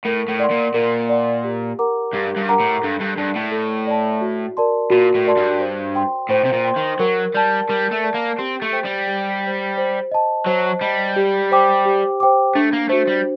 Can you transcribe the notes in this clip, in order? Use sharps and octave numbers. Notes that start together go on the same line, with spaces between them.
A2 A#4
A2
D5 F#5 C6
A#2
A#2 A#4
D5 F#5 C6
G4
A#4 F#5 A#5 D6
G2 G4
G2
A#4 F#5 A#5 D6
A2
G2 A4
G2
G2 D5 A5
A2
A4
D5 A5
F#4
A#4 D5 A5 C6
A#2 F#4
A2
A#4 D5 A5 C6
G2
C5
G5 C6
A2 C5
C3
A#2
G5 C6
D#3
F#3 A#4
G3 D5 A5
G3 A#4
A3
D5 A5
A#3
C4 G4
A3
C5 G5
G3
G4
C5 G5
C5
D#5 A5
F#3 C5
G3 D#5 A5
G4
C5 G5 D6
G4
C5 G5 D6
A3 D4
A#3
A3 F#4 C5
G3